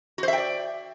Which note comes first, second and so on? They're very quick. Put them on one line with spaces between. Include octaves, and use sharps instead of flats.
F#4 C5 E5 G5 D5